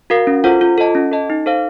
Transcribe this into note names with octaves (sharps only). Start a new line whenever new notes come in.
F#4 A#4 F5
C#4
F4 A4 C5 F#5
F4
A4 D#5 A5
C#4
A4 D#5 A5
D#4
A4 C5 F5